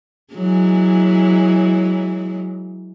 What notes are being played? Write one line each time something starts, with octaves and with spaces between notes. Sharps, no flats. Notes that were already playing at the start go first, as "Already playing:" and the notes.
E3 F#3 G#3